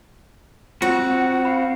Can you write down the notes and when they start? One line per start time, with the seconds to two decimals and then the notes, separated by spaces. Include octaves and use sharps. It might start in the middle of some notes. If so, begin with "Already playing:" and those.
0.82 C4 F4 F#4 F#5
1.45 F5 B5